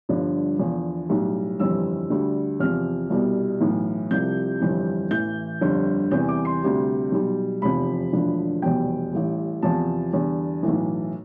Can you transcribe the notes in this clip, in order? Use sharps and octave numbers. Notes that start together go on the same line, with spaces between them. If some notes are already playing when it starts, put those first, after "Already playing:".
G1 G2 D3 F3
E2 D3 F3
B1 A2 G3
G1 F2 E3 G3 E6
D2 D3 G3
E2 C3 F3 F6
C2 B2 G3
B1 A2 E3
C2 C3 F3 G6
G1 F2 E3 G3
A1 A2 E3 G6
G1 F2 D3 G3
E2 C3 E3 G3 G6
D6
C6
D2 C3 G3
B1 B2 G3
F1 E2 C3 F3 B5
E1 D2 D3 F3
F1 E2 B2 G3 G5
A1 A2 G3
E2 C3 F3 A5
E2 D3 G3
B1 A2 E3